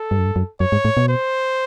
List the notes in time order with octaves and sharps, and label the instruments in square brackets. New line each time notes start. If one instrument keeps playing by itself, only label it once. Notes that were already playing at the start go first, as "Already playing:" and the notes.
Already playing: [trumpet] A4
[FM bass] G2
F#2
G2
F#2
[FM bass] F#2 [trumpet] C#5
[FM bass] G#2
A2
B2
[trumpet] C5